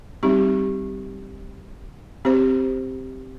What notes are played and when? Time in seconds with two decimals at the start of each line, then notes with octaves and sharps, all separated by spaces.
0.23 G3 C4 D#4 G4
2.25 C4 G4 C5